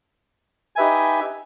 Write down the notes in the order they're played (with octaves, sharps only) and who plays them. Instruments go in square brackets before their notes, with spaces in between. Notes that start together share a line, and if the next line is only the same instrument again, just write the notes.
[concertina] D#4 G4 B4 E5 G#5